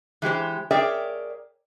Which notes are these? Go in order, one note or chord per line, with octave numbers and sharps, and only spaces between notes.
E3 G#3 G4 C5
G#4 A#4 C#5 D5 E5 G5